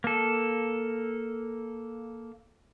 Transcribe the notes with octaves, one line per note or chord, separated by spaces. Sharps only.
A#3 A4